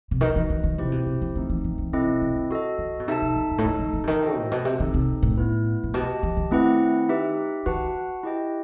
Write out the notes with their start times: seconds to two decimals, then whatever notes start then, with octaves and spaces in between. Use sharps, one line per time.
0.11 C3
0.21 D#3 D#4 F#4 B4 D#5
0.36 E3
0.50 D#3
0.63 D#3
0.78 C3 C4 E4 G4 C5
0.92 B2
1.06 C3
1.22 E3
1.35 D#3 A3 C4 D#4
1.50 E3
1.64 E3
1.78 E3
1.92 C3 C4 E4 A4 D#5
2.07 B2
2.22 C3
2.35 D#3
2.51 F#4 A4 D#5
2.78 D#3
3.00 B2
3.08 C3 D#4 A4 E5 A5
3.22 B2
3.36 E2
3.51 F#2
3.58 A2
3.65 G2 D#4 A4 D#5 A5
3.79 D#3
3.93 E3
4.04 C3
4.08 D#3
4.22 F#4 A4 C5 D#5 G5
4.38 A2
4.52 B2
4.65 C3
4.79 D#3 C4 D#4 A4
4.94 C3
5.22 A2
5.37 B3 E4 B4
5.84 A2
5.94 B2 G4 D#5 A5
6.23 E3
6.37 D#3
6.51 A3 C4 E4 B4 F#5
7.08 D#4 G4 B4 E5
7.66 D#3 F#4 B4 F#5 A5
8.23 E4 G4 D#5 G5